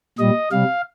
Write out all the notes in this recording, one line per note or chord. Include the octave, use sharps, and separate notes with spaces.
A#2 G3 D#5
C3 G3 F5